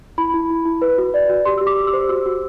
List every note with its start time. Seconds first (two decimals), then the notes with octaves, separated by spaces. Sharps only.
0.18 E4 B5
0.34 E4
0.50 E4
0.65 E4
0.82 B4
0.98 F#4
1.14 D5
1.29 F#4
1.46 G4 C6
1.58 G4 E6
1.67 D6
1.77 G4
1.87 E6
1.93 C5
2.09 F#4 E6
2.26 F#4